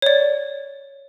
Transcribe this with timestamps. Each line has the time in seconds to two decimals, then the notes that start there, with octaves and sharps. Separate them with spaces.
0.02 C#5 D5